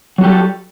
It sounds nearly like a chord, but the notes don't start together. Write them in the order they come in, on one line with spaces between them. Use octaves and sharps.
F#3 F#4 G4 A4